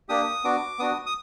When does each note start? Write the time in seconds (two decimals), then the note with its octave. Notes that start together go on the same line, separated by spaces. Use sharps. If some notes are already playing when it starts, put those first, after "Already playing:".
0.09 A#3 D4 G4 D#6
0.44 B3 D4 F#4 D6
0.79 B3 D4 F#4 D#6
1.06 D#6